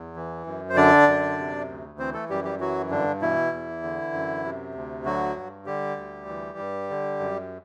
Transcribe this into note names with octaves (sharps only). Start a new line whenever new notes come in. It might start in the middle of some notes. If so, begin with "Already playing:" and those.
Already playing: E2
E3
F#2
C5
D3 D4 D5
F#2
C3
D2
E3 C4 C5
A3 A4
F#2 G3 G4
G3 G4
E3 F#3 F#4
G2 D3 D4
B2 E3 E4
E2
D3
F#2
C3
D2
D3 F#3 F#4
G2
D3 G3 G4
D2
E3
G2
D3
F#2